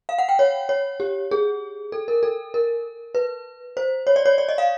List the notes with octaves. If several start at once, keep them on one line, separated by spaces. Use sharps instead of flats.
F5
F#5
G5
C#5
C#5
G4
G#4
A4
A#4
A4
A#4
B4
C5
C#5
D5
C#5
D5
D#5
F5